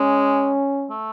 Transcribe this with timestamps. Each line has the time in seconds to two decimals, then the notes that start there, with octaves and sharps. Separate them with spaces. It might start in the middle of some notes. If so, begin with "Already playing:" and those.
Already playing: G#3 C#4
0.90 A3